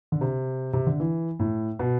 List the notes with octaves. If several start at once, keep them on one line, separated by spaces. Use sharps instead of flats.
D3
C3
C3
D3
E3
A2
B2